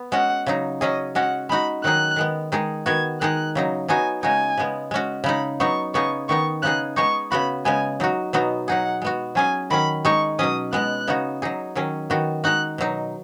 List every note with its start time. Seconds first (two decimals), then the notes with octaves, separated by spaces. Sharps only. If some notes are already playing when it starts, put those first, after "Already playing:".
Already playing: B3
0.12 G#3 C#4 F#4 F#5
0.46 C#3 F#3 D#4
0.81 F#3 C#4 G#4 D#5
1.15 G#3 C#4 F#4 F#5
1.49 G#3 D#4 F#4 B5
1.84 D#3 F#3 D#4 G#4 F#6
2.16 D#3 G#3 B3
2.52 D#3 G#3 D#4 G#4
2.86 D#3 B3 F#4 G#6
3.21 D#3 G#3 D#4 G#4 F#6
3.55 C#3 F#3 D#4
3.88 F#3 B3 D#4 F#4 G#5
4.23 C#3 G#3 D#4 F#4 G#5
4.58 C#3 G#3 B3
4.91 G#3 C#4 F#4
5.24 C#3 G#3 D#4 B5
5.60 F#3 B3 D#4 C#6
5.94 C#3 B3 D#4 G#4 C#6
6.29 D#3 B3 D#4 C#6
6.62 C#3 B3 D#4 G#4 F#6
6.96 G#3 B3 D#4 G#4 C#6
7.31 C#3 B3 F#4 B5
7.65 C#3 G#3 B3 G#5
8.00 F#3 D#4 F#4
8.33 B2 F#3 B3 D#4 F#4
8.68 F#3 D#4 G#4 F#5
9.02 G#3 B3 F#4
9.35 F#3 C#4 G#4 G#5
9.70 D#3 F#3 C#4 B5
10.05 G#3 D#4 G#4 C#6
10.39 B2 F#3 C#4 D#6
10.73 B2 G#3 B3 F#6
11.07 C#3 B3 D#4 F#4
11.42 F#3 D#4 G#4
11.75 D#3 F#3 C#4 G#4
12.10 D#3 B3 F#4
12.44 G#3 D#4 F#4 F#6
12.78 B2 F#3 D#4